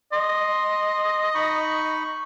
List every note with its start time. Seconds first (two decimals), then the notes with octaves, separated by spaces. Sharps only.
0.12 D#5 C6
1.35 D#4 B5 C#6